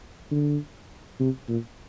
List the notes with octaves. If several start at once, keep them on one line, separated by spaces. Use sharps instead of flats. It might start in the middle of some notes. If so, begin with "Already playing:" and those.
D3
C3
A#2